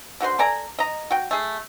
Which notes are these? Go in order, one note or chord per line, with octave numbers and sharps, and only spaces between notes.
D3 F#4 C5 C6
A4 D5 G#5 A#5
D#5 A#5
F#4 G5
A3 G#4